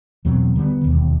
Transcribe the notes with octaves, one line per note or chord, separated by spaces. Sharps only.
E2 B2 F#3 C4
D3 G3 A#3 B3
E1 D#2